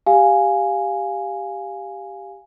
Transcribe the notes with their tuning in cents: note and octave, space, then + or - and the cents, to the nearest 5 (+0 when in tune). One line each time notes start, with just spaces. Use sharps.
G4 +5 F5 +0 G#5 +0